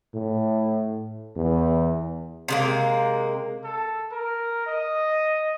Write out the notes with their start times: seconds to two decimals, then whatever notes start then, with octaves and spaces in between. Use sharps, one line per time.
0.14 A2
1.36 E2
2.48 C3 G#3 A#3
3.64 A4
4.11 A#4
4.67 D#5